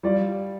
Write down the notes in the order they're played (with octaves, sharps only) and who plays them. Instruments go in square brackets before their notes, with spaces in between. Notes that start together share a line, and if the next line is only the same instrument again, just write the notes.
[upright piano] G3 F4 D5